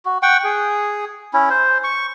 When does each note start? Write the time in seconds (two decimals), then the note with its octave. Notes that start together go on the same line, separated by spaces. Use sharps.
0.05 F#4
0.23 F#5 G5 C#6
0.44 G#4
1.34 C#4 E4
1.50 C5
1.84 C#6